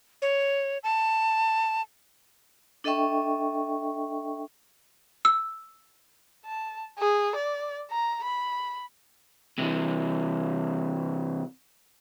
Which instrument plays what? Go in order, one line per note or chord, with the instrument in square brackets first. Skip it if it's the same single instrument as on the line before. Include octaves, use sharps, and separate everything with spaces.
[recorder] C#5
A5
[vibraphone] D4 A4 D#5 E5 G5 C#6
[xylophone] E6
[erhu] A5
G#4
D5
A#5
B5
[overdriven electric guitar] C3 E3